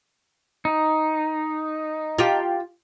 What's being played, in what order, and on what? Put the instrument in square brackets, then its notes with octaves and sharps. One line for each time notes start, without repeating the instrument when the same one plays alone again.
[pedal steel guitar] D#4
[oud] F4 G4